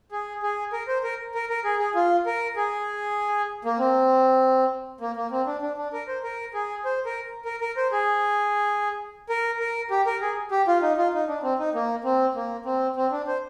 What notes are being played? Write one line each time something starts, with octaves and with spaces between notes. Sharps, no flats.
G#4
G#4
A#4
C5
A#4
A#4
A#4
G#4
G#4
F4
A#4
G#4
A#3
C4
A#3
A#3
C4
D4
D4
D4
A#4
C5
A#4
G#4
C5
A#4
A#4
A#4
C5
G#4
A#4
A#4
G4
A#4
G#4
G4
F4
D#4
F4
D#4
D4
C4
D#4
A#3
C4
A#3
C4
C4
D4
C5